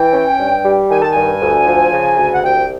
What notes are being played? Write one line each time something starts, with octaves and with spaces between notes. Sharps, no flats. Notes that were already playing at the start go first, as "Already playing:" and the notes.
Already playing: E3 G5
C#4
G2
G3
D#3 G#5
A5
G2 G#5
D2
F3
C#3
D2
F#5
C2 G5